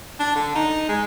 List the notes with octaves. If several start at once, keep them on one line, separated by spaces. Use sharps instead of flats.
D4
D3
D#4
G#3